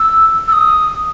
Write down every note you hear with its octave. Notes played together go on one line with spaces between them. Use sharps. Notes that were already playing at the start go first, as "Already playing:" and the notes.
Already playing: E6
E6
D#6